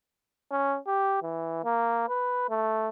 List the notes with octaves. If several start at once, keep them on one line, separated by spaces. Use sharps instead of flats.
C#4
G4
E3
A#3
B4
A3